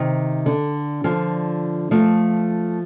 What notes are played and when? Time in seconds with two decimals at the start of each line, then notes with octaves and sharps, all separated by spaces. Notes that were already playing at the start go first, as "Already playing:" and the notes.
Already playing: C3 D#3
0.46 D3
1.04 D3 F3
1.91 F3 A3